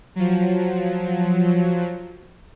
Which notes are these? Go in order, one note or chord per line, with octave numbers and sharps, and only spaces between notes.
F3 F#3